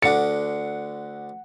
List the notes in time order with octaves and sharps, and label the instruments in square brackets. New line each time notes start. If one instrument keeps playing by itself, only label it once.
[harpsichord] D2 D3 D4 [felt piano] F#5 C#7